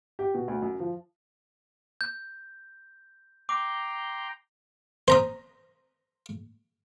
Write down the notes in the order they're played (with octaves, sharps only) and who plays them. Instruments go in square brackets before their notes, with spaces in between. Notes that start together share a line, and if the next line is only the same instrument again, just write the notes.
[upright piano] G4
B2
D2
F#2
F3
[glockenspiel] G6
[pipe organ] G5 A#5 C6 [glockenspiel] D6
[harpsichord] C5 A#5 D#6